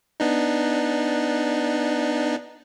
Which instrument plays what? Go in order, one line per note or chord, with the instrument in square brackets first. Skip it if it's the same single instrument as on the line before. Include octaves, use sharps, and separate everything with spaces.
[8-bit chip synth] B3 D4 D#4